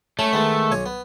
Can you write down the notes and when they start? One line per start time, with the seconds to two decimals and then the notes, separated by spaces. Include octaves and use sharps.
0.19 A3 C#4 A4
0.33 D#3 G#3 B3
0.72 B1 C#5 G#5
0.86 B3